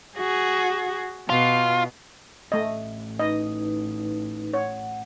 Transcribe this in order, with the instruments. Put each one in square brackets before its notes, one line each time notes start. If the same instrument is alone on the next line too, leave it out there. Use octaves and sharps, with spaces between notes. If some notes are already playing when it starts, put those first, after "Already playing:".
[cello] F#4 G#4
[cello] B2 [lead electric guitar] F4
[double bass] A1 [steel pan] A3 D#5
[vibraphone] D#4 B4 [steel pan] D#5
[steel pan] C#5 [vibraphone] F#5